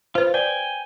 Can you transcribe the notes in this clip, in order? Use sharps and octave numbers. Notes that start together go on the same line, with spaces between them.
F4 B4 C5
D5 G5 G#5